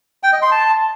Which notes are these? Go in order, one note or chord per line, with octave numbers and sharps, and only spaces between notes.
G5
D#5
C6
A5